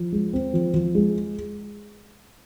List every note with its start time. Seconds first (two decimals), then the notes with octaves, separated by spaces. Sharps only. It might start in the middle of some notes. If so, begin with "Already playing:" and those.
Already playing: F3
0.12 G#3
0.33 C4
0.53 F3
0.74 F3
0.95 G#3